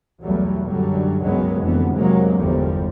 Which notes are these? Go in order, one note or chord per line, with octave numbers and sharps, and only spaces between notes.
B1 E2 F#3 G3 A3
F#2 D3 F#3 G3
C#2 G2 D#3 F#3 G#3 B3
F1 F2 D3 E3 B3
C3 F#3 G#3 A#3
G1 E2 D3 F3 G3